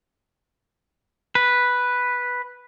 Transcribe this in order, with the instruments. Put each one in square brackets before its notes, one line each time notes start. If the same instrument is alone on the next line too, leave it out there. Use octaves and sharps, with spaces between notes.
[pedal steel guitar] B4